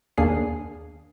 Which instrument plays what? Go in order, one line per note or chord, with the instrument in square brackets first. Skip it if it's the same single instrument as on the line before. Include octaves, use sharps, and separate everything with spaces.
[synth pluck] D#2 A#3 D4 G#4 C7